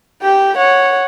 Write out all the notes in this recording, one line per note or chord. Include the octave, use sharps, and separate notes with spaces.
G4 G5
C#5 F#5